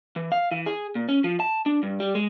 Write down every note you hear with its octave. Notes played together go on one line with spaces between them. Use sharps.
E3
F5
E3
G#4
A#2
C#4
F3
A5
D4
G2
G3
G#3